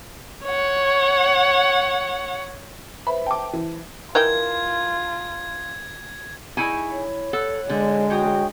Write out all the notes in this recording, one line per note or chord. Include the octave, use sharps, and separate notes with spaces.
C#5 F#5
B4 C5 E5 B5
G5 A5 D6
E3
E3 D#4 F4 A#4 G5 G#6
D#4 E4 G#4 G#5 C#6
C#5
A4 F#5
D3 G#3
F#4 C#5 G5 D#6